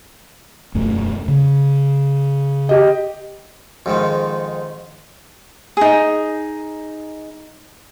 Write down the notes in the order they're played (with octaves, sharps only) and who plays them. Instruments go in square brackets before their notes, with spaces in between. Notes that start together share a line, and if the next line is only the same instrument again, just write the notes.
[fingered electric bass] E1 F#2 A3
C#3
[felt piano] G4 D#5
[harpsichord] F2 G#2 D#3
[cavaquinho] D#4 G#4